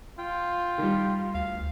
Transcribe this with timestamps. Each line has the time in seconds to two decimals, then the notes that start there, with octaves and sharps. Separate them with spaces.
0.19 F4 G5
0.78 D#3 G3
1.34 D2 F5